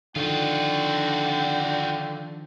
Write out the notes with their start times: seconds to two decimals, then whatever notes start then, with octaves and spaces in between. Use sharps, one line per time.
0.16 D3 D#3 F3 F4 F#4 G5